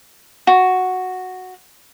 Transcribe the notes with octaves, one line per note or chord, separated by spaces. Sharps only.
F#4